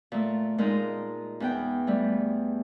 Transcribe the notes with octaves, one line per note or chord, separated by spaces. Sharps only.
A#2 A3
A#2 G#3 D#4 A#4
E2 B3 G5
G3 A3